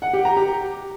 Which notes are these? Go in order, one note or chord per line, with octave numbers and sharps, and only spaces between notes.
F#5
G4
A#5
G4